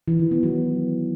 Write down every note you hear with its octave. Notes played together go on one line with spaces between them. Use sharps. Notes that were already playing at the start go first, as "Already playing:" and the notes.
E3
D#3
B3
F#3